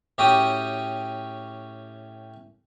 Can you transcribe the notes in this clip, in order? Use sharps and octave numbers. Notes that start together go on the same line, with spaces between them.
A2 C#4 F#4 G4 G5 D#6